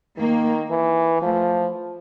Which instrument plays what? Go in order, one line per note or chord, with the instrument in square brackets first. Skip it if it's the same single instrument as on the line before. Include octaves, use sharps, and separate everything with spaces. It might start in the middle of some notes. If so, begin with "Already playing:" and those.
[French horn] D#3 [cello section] A#3
[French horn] E3
[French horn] F3 [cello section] A3